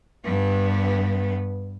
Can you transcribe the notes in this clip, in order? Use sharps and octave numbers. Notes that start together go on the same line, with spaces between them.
G2 B3